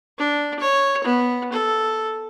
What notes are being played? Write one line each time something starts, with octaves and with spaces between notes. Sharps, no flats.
D4
C#5
B3
A4